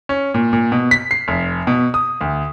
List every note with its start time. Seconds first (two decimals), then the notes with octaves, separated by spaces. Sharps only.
0.09 C#4
0.34 A#2
0.53 A#2
0.72 B2
0.91 B6
1.11 C7
1.28 F1
1.67 B2
1.94 D#6
2.21 D2